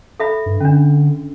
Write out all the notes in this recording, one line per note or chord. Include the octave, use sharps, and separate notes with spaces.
A4 E5 B5
G2
D3 C#4 D4